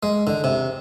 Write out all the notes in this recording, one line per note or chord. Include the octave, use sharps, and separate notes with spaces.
G#3
D3
C3